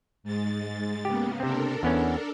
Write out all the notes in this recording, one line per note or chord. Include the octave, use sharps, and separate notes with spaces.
G#2 G#3 A6
C#3 A#3 B3 G4
C3 C4 D4 A4 A#4
E2 B3 C#4